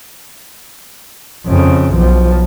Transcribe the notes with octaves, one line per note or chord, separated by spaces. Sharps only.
F2 C#3
B1 F3